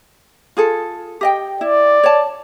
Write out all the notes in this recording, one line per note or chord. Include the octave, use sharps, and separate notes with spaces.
F4 G#4 A4
G4 D#5 G5
E4 D5
C#5 A5